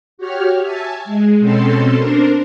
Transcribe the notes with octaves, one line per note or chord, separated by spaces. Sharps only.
F#4 G4 C#5 F6
E5 G#5 A5
G#3
B2 C4 C#4 A4 C6
D4 A#4 C5